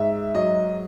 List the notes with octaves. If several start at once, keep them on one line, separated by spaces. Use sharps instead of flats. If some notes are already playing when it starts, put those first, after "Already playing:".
Already playing: G#2 E5
F#3 D#5